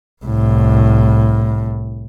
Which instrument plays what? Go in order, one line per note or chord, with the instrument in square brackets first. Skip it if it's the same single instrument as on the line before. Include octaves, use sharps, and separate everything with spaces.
[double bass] C2 A2